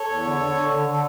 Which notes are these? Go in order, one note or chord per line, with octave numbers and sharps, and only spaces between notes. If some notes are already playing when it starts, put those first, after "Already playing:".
Already playing: A4 C#5
E2
D3
D3
D3
D3
D3
A4